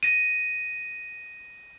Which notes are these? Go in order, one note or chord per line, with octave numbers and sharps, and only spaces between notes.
A#6 D#7